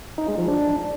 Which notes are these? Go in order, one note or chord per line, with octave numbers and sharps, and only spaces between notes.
D#4
G#3
F3
D4